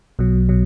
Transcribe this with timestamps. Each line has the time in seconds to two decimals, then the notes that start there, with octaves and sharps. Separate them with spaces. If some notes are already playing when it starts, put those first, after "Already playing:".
0.19 B1 B2 F#3
0.49 B2 F#3